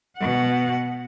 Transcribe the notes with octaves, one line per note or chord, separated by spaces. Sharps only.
B2 F#5